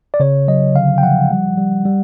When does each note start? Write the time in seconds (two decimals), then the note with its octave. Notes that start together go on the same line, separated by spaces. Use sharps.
0.14 D5
0.20 C#3 C#5
0.48 F#3 D#5
0.75 D3 F5
0.98 G5
1.03 F3 F#5
1.31 G3
1.58 G3
1.85 G3